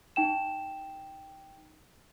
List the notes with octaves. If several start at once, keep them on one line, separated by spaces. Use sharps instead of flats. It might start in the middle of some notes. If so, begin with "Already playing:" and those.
D#4 G5 E7